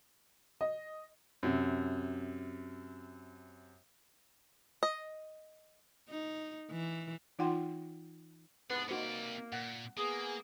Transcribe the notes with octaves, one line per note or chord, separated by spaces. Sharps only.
D#5
F#2 C3
D#5
D#4
E3
E3 D#4 F4 F#5 G5 C6
G#2 C3 B3 D4 B4
C3 A#3 D#4 F#4 C5 D5
A#2 F#5
A#3 B3 G#4